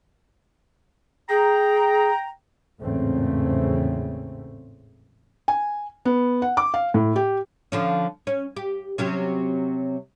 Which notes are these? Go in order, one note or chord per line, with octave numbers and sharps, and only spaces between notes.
G#4 G5 A#5
G#1 E2 A2 C#3 A3 C4
G#5
B3
F#5
D6
F5
A2
G4
D3 F3 C#4
C#4
G4
C3 F#3 C#4